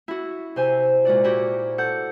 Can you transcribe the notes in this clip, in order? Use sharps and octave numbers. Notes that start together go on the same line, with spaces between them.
E4 F#4
C3 C5 G#5
A#2 G#3 F#4 D5
E4 F#4 G4
A4 F#5 G6